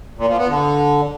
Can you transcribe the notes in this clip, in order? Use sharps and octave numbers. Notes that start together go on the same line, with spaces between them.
A#2
F3
B3
D3